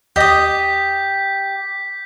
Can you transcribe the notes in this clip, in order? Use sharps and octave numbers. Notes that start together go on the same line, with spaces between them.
D#2 G4 D#5 D#6 G6 A#6 B6